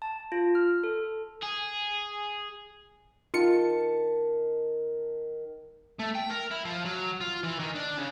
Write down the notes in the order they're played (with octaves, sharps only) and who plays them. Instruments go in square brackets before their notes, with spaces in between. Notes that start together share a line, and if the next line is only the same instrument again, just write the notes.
[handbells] A5
F4
F6
A4
[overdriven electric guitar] G#4
[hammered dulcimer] D#3 A5 [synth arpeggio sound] F4 C#7
[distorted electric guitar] A3
G5
A#4
E4
F3
F#3
F4
E3
D#3
D4
C#3